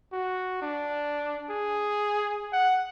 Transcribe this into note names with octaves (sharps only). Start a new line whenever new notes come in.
F#4
D4
G#4
F#5